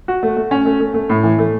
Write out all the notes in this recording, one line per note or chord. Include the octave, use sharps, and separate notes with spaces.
F#4
A3
A3
C#4
A3
A3
A3
A2
E3
A3